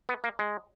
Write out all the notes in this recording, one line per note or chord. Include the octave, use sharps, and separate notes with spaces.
B3
A#3
G#3